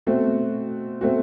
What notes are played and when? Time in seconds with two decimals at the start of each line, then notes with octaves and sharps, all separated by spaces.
0.07 B2 A3 C4 F#4
1.01 B2 A3 C4 F#4